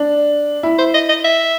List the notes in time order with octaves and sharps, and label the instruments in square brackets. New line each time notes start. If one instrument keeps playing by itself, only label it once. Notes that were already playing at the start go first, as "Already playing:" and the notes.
Already playing: [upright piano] D4
E4
[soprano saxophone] C5
D#5
D#5
E5